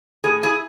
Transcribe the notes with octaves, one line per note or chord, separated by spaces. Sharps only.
A2 G#4
E4 G#4